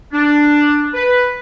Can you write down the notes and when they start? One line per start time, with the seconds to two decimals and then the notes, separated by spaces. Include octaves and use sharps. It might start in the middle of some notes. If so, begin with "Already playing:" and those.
0.13 D4
0.94 B4